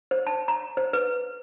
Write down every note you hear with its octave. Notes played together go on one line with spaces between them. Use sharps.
C5
A5
A#5
C5
B4